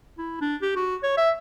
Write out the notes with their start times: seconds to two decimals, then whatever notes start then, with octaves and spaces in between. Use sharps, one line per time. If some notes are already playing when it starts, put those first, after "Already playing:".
0.18 E4
0.41 D4
0.62 G4
0.76 F#4
1.03 C#5
1.17 E5